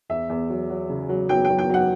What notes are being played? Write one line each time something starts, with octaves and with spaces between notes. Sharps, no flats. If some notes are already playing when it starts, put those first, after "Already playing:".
E2 E5
E2
F#3
F#3
C#3
F#3
F#3 G5
G5
F#3
G5
F#3 F#5